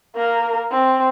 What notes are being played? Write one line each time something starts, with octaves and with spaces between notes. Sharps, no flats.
A#3 A#4
C4